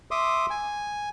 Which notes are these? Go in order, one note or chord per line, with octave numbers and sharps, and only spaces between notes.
E5 C6 D6 D#6
G#5